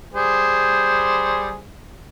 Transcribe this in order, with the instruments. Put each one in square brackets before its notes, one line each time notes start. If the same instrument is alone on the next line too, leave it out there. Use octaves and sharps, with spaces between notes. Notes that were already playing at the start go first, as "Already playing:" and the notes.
[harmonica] G3 G#4 C5